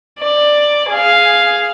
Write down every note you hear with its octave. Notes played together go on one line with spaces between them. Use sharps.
D5
G#4 F5